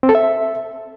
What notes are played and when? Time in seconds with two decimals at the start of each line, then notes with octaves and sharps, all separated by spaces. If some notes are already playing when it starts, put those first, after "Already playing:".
0.03 C4
0.09 A4
0.15 E5